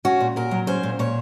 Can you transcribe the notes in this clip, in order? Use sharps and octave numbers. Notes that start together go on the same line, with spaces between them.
C#4 F#4
A#2
A#2 A#4
F#3
C#4 C5
A#2
A#2 C#5